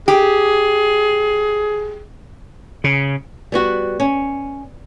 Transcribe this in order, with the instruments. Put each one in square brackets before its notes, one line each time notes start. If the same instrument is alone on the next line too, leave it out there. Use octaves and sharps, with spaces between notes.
[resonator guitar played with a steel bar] G4 [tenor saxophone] G#4
[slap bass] C#3
[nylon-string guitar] G3 B3 F#4
C#4